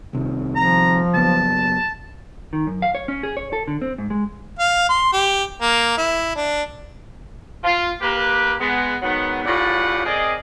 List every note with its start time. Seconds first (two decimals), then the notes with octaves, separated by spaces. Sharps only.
0.13 C2 C3 D#3
0.56 F3 A#5
1.14 F#1 F#2 B3 A5
2.53 D#3
2.67 F#2
2.82 F5
2.95 C#5
3.08 C#4
3.23 G#4
3.37 C#5
3.53 A4
3.67 D3
3.82 C4
3.98 G#2
4.10 G#3
4.59 F5
4.89 C6
5.13 G4
5.62 A#3
5.97 E4
6.36 D4
7.64 F4
8.01 A#3 G4 B4
8.59 G#3 B3
9.02 G#2 D#3 F#3 B3
9.45 A2 C#3 G3 F4 D5 F#5
10.05 C4 G#4 A#4 D5 D#5